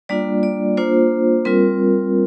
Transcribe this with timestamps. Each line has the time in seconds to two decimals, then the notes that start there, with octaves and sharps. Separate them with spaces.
0.09 G3 A#3 D4 F4 D5
0.43 D5
0.77 A#3 D4 F4 C5
1.45 G3 C4 F4 A#4